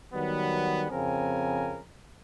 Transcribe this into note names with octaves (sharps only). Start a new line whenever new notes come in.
D#3 F#3 G3 B3
F2 C#3 C4 A#4 G#5